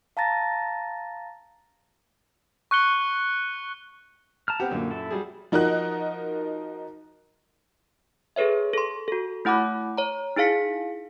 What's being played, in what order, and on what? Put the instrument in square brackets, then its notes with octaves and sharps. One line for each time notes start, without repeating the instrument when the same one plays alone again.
[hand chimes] F5 A5 A#5 A6 A#6
[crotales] C#6 F#6 C#7 G7
[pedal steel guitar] A5 A#5 F6
[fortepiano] B3 C4 G4 [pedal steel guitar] F#5
[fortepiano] F#2 A#2 [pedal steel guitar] D3 A#3
[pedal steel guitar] E4 A4 E5
[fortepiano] F#3 G3 G#4
[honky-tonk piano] F3 D#4 F#4 A#4 D#5 F#6
[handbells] G#4 A4 B4 C#5 E5
A4 C6
F#4 A4
A3 E4 F#5 B5 D6 F#6
C#5 A#5
D#4 E4 G#4 F5 B6 C#7